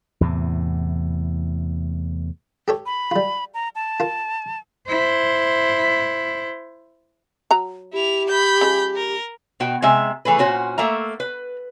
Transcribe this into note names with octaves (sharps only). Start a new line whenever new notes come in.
E2 A2 C3
G4 A4 C#5
B5
G3 F4
A#5
A5
F4 A#4
E4 C5
F#3 A#5
E4 G4 F7
B5 G6
C#3 F3 G#3
A#4
B2 F#4 G5
C3 G#3 E5
E3 A3 G#4 B4
A#2 C#4 F#4 C5
A3 A#3 E5 A#5
B4